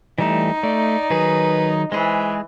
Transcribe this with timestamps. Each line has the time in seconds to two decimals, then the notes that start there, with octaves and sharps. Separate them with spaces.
0.18 E3 G3 A3 D#4
0.63 A3 D5
1.10 D#3 F#3 G#4 B4
1.92 E3 G#3 G#4 C5